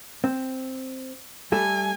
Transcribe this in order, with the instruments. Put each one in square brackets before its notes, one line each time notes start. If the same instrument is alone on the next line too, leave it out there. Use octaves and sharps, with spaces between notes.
[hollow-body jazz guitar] C4
[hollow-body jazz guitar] G3 A3 A4 [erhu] G#5